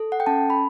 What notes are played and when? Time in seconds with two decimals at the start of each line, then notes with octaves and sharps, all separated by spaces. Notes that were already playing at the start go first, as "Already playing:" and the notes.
Already playing: A4
0.12 F#5
0.20 G5
0.26 C#4 A5
0.50 B5